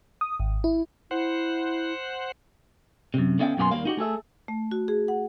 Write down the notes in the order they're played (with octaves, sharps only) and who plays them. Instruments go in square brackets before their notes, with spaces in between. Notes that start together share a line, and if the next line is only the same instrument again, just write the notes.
[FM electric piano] D#6
G#1
E4
[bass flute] E4 [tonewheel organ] C5 F#5
[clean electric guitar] F#2 C3
D3 B3 C#4 E5 F5 G5
F#2 B2 A#3 G4 G#5 C6
D#2 G3 A#3 F5
D#4 F#4 G4
A3 G#4 A4 E5
[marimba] A3
F#4
G#4
F#5